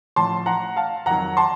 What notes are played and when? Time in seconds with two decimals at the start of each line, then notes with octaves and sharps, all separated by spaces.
0.16 A1 A2 F3 A5 C6
0.46 F#5 A#5
0.76 F5 A5
1.06 F2 D#3 F#3 F#5 A#5
1.37 A5 C6